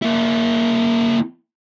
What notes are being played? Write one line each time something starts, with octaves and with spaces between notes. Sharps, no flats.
A#3 E4